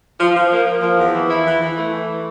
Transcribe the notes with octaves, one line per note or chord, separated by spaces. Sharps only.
F3
F3
A#3
A#3
F3
E2
E3
E4
E3
E3
A3
E3